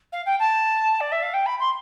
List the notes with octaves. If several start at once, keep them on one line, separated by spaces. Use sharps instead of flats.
F5
G5
A5
D5
E5
F5
G5
B5
C6